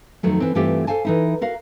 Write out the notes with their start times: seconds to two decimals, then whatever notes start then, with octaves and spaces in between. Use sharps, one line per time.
0.23 F2 D#3 F#3 A3
0.40 E3 C4
0.55 G2 E3 A3 C4 F4 G4
0.87 A4 A#4 C5 F5 G#5 A5
1.05 E3 D#4 E4
1.41 F#4 A#4 F5